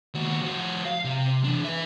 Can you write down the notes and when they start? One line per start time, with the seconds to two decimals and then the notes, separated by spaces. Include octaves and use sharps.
0.14 D#2 F#4
0.41 F3 F#4
0.85 F5
1.04 C3
1.44 E3 D4
1.65 B4 E5